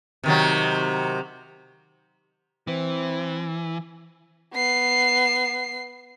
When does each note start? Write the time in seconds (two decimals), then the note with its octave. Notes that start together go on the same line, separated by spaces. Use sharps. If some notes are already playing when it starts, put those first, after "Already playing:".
0.23 C3 D#3 F#3
2.67 E3 C4
4.54 B3 C7